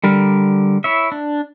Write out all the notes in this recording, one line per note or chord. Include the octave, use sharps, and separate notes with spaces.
D3 G3 A#4
E4 C#5 E5
D4